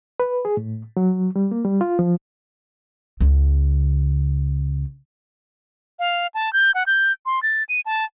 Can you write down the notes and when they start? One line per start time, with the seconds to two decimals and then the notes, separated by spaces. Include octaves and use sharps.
0.20 B4
0.45 G#4
0.57 A2
0.97 F#3
1.36 G3
1.51 A#3
1.65 G3
1.81 F4
1.99 F3
3.20 C#2 C#3
5.99 F5
6.34 A5
6.53 G6
6.75 F#5
6.87 G6
7.26 C6
7.43 A6
7.69 D#7
7.86 A5